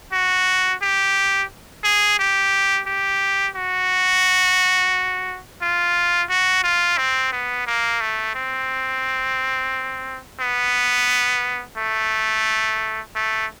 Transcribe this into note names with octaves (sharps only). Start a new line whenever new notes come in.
F#4
G4
G#4
G4
G4
F#4
F4
F#4
F4
C4
B3
A#3
A3
C4
B3
A3
A3